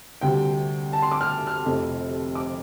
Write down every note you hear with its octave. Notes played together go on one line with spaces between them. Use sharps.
D2 C3 G3 G5
A5
C6
D6
F6
F6
F1 F2 C3 A3
D6